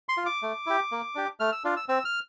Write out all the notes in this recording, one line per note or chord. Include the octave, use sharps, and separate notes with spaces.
C6
F4
D6
A3
E4 G4
A#3
D4 G4
A3 F6
E6
D4 F4
E6
C4 E6
F6